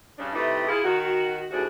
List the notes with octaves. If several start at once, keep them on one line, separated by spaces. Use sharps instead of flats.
G2 C#3 D4
C3 G3 A3 D#4 E4 B4
E4 F4 G#4
D#3 F#4
D#2 A2 C3 D4 F#4 G#4